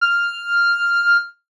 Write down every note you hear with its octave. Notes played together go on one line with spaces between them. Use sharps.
F6